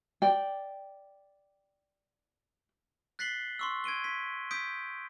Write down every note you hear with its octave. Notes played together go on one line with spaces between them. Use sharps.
D5 G5
F#6 A6 B6 C7 F#7 G7
C6 C#6 E6
G#6 D7 D#7 G7
B6
D#6 G6 B6 D7